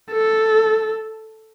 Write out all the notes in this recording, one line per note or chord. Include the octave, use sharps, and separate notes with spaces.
A4